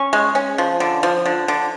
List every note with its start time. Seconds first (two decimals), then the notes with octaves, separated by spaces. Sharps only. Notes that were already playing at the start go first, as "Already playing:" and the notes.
Already playing: C#4 C#6
0.13 G#3
0.35 C#4
0.58 F3
0.80 D3
1.03 F3
1.26 D3
1.48 D3